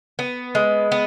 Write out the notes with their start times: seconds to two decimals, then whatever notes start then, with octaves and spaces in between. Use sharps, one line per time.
0.19 B3
0.55 G#3
0.92 B3